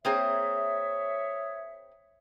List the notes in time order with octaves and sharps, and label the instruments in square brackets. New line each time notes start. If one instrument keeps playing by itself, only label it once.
[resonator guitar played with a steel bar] A#3 C4 G#4 [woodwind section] C#5 E5 [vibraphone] D#6